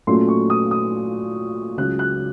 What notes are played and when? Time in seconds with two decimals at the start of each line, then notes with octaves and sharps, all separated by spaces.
0.07 A#2 F#3 A3 C#4 C6
0.28 C#6
0.50 D#6
0.71 D#6
1.78 C#2 C#3 F#3 F#6
1.99 F#6